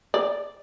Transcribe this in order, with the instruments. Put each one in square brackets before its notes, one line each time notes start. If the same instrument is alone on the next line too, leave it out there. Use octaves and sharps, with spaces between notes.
[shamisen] D5